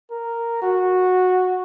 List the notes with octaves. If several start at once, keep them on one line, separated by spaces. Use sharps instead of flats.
A#4
F#4